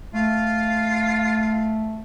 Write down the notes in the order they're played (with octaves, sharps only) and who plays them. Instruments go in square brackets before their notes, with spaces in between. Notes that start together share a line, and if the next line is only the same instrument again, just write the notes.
[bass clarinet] A3 [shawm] F4 [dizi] F5